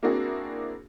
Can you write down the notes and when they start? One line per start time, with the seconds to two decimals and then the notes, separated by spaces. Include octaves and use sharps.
0.03 A#3 C4 D4 E4 F#4 G#4